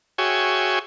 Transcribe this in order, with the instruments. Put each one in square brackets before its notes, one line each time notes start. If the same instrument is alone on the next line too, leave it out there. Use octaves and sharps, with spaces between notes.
[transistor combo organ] F#4 G#4 C#5 E5 G5 G#5